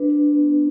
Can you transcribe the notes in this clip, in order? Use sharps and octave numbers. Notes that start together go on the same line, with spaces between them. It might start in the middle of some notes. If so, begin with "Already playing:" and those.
Already playing: D4 B4
D4
B3